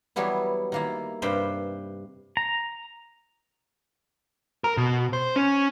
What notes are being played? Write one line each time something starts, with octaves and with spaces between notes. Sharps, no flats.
E3 F#3 G3 B3 E4
D#3 A#3 E4
G2 C3 B4 C5 G5 B5
A#5
A#4
B2
C5
C#4